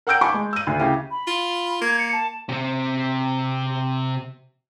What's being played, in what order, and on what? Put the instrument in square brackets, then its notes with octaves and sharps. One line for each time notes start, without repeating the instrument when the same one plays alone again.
[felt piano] A#4 F#5 G5 E6 G6 D7
G#5 A5 B5 C#6 D6
G#3
E6 D#7
D2
C#3 E4 G4
[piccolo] B5
[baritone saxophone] F4
[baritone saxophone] A#3 [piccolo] G#6
[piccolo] C#7
A5
[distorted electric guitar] C3 C4